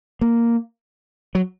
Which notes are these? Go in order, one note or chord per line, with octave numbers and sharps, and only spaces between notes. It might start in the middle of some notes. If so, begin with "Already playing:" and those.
A#3
F#3